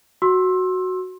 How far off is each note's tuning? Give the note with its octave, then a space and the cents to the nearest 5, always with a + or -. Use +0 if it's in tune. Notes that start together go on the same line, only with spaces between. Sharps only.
F#4 +0 C6 +30 E6 +0